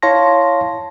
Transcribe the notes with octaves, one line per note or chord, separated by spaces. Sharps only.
E4 C#5 F5 A5 C6 A#6